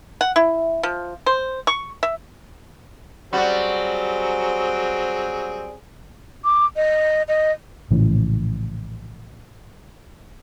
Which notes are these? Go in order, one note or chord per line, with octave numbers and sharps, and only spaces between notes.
F#5
E4
F3
C5
C#6
E5
F#3 G3 C4 F#4 G#4
D6
D#5
D#5
A#1 A2 C#3 E3